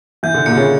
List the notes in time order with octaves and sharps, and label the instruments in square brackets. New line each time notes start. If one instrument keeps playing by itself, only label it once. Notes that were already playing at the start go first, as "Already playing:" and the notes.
[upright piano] E3 [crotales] G6
[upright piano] D3
[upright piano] A#2 [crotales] C#7
[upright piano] D3
C#3